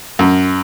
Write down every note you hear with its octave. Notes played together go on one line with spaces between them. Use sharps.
F#2